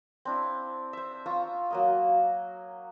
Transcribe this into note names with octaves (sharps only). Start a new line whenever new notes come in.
C4 D4 E4
C5 E5
F4 A#5 C#6 E6
F#3 A#3 D#5